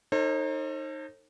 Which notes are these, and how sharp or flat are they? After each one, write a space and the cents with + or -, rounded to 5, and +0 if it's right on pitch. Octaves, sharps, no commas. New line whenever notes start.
D#4 -5 A4 +40 C5 +45